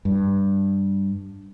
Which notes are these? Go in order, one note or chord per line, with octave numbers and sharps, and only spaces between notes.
G2